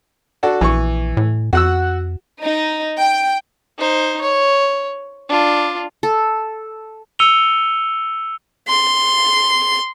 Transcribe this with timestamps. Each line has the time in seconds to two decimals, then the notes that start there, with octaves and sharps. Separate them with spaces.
0.43 D4 F#4 A4
0.61 A#1 E3 C#6
1.17 A2
1.53 F2 F#4 F#5 E6
2.41 D#4
2.99 G5
3.78 D#4 C5
4.21 C#5
5.29 D4 F4
6.03 A4
7.19 E6 C#7 D#7 F7 G7
8.68 C6